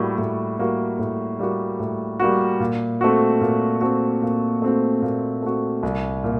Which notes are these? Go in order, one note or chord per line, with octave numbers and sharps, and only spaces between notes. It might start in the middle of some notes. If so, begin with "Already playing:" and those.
Already playing: A2 G3 A#3 F#4
A2
G3 A#3 F#4
A2
G3 A#3 F#4
A2
G3 A#3 F#4
A#2
A3 C4 F#4
A#2
A3 C4 F#4
A#2
A3 C4 F#4
A#2
A3 C4 F#4
C2
A#2